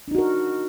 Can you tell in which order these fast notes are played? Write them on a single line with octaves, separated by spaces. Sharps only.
D4 D#4 F#4 A#4